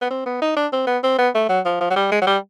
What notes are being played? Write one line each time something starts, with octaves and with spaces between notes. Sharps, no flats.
B3
C4
B3
D#4
D4
C4
B3
C4
B3
A3
F#3
F3
F3
F#3
G3
G#3
F#3
G3